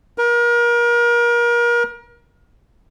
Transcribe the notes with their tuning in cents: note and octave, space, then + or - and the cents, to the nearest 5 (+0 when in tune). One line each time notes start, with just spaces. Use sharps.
A#4 +35